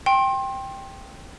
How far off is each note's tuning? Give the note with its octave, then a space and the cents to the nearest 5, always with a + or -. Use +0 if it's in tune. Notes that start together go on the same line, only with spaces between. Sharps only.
G5 +0 C6 +30